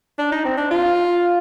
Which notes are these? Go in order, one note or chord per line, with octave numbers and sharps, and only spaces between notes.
D4
D#4
C4
D4
F4